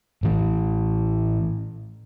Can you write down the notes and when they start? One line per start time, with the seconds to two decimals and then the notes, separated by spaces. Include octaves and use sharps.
0.23 A2 E3